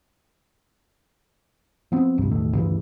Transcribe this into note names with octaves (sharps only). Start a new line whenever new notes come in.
F3 B3 C4
G1 C2 G2
E1 A1 D#3 A3
D2 G2 C#3 E3